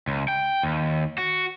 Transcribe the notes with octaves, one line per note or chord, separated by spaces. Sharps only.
C#2
G5
D#2
F#4